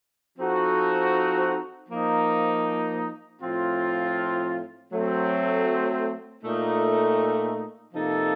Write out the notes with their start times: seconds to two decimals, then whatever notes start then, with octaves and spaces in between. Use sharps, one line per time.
0.37 F3 C4 D#4 F#4 A4
1.88 F3 A#3 D#4
3.40 A2 F3 C4 F4
4.91 F#3 A3 C4
6.42 A#2 A3 D#4
7.93 C3 F3 A#3 D#4 A4